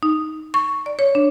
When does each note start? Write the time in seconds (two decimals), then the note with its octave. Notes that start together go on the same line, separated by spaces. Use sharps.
0.03 D#4
0.54 C#6
0.86 D5
0.99 C#5
1.15 D4